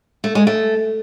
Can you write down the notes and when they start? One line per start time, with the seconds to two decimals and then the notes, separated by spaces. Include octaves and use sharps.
0.24 A3
0.35 G#3
0.47 A3